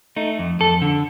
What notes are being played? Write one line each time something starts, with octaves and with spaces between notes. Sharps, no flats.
A3 D#4
F2
F2 A4
D3